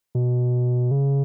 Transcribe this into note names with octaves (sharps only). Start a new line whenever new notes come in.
B2
C#3